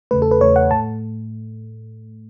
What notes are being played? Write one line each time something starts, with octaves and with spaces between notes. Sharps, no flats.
E2 C#3 A3 B4
A4
B4
E2 C#3 A3 C#5
F#5
A2 A3 A5